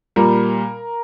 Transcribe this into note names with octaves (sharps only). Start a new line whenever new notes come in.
A#2 G3 A#4